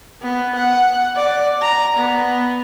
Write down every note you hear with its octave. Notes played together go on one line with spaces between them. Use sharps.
B3
F#5
D5
A#5
B3